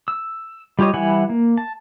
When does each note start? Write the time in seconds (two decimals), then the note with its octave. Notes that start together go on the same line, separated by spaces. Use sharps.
0.08 E6
0.79 G3 F4 G4 C#5 D#5
0.94 E3 G3 E4 F#5 G#5
1.29 A#3
1.58 A5